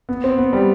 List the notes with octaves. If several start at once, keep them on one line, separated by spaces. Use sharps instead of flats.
B3
C4
B3
G3